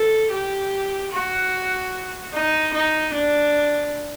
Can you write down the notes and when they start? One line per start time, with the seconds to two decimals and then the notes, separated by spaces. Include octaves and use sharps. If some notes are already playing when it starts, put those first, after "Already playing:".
Already playing: A4
0.32 G4
1.12 F#4
2.34 D#4
2.74 D#4
3.14 D4